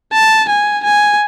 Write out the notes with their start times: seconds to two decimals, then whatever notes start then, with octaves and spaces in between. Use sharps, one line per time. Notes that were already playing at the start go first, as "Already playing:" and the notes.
0.13 A5
0.49 G#5
0.84 G#5